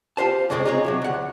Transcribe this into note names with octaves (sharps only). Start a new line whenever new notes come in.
F4 G4 C5 A5
F2 C#3 F3 G#3 G#4 D5
D#4 F4 G#4 A#4 C#5
C3 E3 F#3
D2 F#5